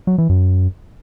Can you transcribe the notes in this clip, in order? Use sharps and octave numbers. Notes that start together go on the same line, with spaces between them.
F#3
E3
F#2